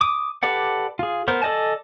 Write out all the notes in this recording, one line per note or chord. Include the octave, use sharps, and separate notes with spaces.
D6 D#6
G4 A4 B4 D5 F#5
F4 G#4
B3 A#4 C5
A4 D5 D#5 G#5 A5